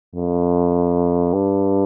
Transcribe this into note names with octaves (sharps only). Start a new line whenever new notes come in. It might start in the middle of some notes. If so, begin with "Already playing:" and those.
F2
G2